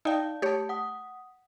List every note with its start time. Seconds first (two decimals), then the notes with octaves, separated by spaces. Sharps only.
0.05 D#4 D5 F5 G5 A5
0.42 A3 G4 C#5 A5
0.69 F#5 D#6